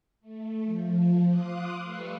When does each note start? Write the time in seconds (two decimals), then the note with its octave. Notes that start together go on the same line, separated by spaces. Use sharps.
0.21 A3
0.64 F3
1.27 F5 C6 D6 D#6 F#6
1.85 G3 A3 B4 C#6 E6 F6